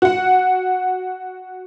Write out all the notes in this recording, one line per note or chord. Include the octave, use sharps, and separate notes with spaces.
F#4 F#5